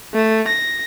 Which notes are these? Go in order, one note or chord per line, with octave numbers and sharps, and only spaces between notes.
A3
A#6